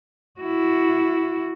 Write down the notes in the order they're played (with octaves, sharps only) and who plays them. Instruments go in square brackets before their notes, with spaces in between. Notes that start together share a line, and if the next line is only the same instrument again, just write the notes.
[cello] E4 F#4